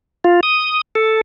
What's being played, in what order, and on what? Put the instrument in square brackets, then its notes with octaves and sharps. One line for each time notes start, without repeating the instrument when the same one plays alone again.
[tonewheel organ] F4
D#6
A4